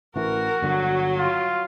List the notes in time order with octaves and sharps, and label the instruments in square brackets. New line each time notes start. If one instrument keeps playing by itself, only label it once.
[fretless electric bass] A1 E3 [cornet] F#4 [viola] A#4
[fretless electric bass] G1 D3 [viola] F#3
[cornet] F4